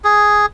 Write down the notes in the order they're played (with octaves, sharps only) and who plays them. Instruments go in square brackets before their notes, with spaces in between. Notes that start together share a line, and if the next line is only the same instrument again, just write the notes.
[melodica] G#4